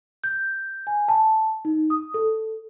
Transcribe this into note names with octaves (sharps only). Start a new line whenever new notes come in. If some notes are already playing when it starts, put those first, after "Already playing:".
G6
G#5
A5
D#4
D#6
A4